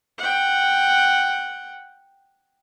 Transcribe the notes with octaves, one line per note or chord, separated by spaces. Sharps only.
F#5 G5